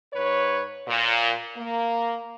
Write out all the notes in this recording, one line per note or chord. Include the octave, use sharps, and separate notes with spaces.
G#2 B4 C#5
A#2
A#3